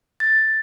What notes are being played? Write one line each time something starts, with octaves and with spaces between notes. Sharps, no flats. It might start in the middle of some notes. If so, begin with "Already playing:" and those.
A6